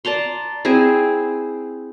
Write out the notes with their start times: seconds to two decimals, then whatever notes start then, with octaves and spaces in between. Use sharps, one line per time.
0.05 D5 A5 A#5 C6
0.65 C4 E4 G#4 G#5